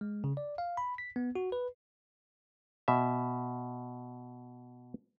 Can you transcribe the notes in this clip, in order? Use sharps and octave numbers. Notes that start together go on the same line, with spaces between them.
G#3
C#3
D5
F5
B5
B6
B3
F#4
B4
B2 E5